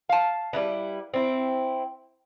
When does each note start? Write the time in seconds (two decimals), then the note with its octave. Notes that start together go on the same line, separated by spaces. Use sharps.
0.09 F5 A5
0.53 G3 E4 B4
1.14 C4 E4